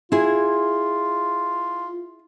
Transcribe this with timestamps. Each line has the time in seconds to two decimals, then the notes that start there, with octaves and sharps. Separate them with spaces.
0.12 E4 F4 G#4